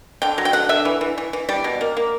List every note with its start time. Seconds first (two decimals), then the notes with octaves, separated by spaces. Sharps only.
0.22 D3 G5
0.38 F#3
0.45 G5
0.53 D3 F#5
0.69 D3 E5
0.85 E3
1.01 E3
1.18 E3
1.33 E3
1.49 G3 D5
1.64 B2
1.81 A#3
1.97 A#3